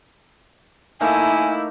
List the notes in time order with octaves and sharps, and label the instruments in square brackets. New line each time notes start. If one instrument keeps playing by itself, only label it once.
[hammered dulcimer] A3 A#3 D#4 [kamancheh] E4 [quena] G#5